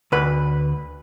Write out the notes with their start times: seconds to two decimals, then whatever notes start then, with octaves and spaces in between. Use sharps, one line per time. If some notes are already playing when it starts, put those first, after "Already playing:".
0.12 D2 B4